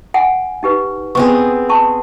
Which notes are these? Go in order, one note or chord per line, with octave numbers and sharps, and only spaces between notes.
F#5 G#5
D#4 G4 B4
B3 C4 G#4 C#6
A5 C#6